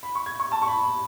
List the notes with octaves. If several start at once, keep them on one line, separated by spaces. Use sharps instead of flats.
B5
C#6
G#6
C#6
A5
C#6
B5
B5